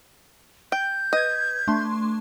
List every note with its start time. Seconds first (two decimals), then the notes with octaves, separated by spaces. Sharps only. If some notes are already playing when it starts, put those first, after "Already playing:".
0.72 G5 G6
1.13 B4 D#5 G#6
1.67 A3 D4 C6